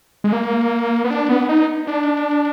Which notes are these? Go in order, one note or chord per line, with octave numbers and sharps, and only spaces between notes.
G#3
A#3
B3
D4
B3
D#4
D4